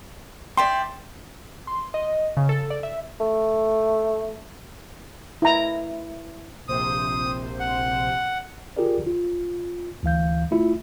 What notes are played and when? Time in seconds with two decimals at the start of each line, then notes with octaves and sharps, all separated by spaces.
0.57 D5 E5 G5 C6
1.67 C6
1.94 D#5
2.37 C#3
2.49 A4
2.70 D5
2.83 E5
3.20 A3
5.42 E4 A#5
6.68 A#1 C3 C5 D#6
7.60 F#5
8.77 F4 G4 G#4 A#4 D5
9.06 F4
10.03 D2 E3 F5 G6
10.51 A3 E4 F4